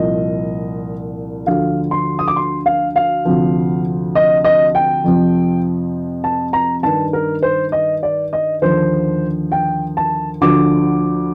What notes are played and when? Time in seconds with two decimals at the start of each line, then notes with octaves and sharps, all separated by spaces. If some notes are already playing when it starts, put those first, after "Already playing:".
Already playing: C2 A#2 F3 D#5
1.47 D2 D3 F3 F5
1.91 C6
2.19 D#6
2.28 D6
2.36 C6
2.66 F5
2.96 F5
3.25 D2 C3 F3
4.15 D#5
4.45 D#5
4.75 G5
5.04 F2 C3 F3
6.24 A5
6.53 A#5
6.83 G2 D#3 A5
7.13 A#4
7.42 C5
7.72 D#5
8.03 D5
8.33 D#5
8.62 D#2 D3 F3 C5
9.52 G5
9.97 A5
10.41 D2 D3 F3 D6